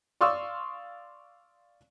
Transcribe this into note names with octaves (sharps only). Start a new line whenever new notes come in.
D5 F5 C6 C#6 D#6 E6